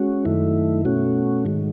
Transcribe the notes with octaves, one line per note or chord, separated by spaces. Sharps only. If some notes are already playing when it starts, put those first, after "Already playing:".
Already playing: G#3 C#4 F#4
F#2 D#3 A3 E4
B2 A3 C#4 F#4
G#2 D#3 G#3